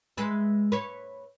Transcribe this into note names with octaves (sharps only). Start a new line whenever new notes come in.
G#3 B4 E5
B4 C#5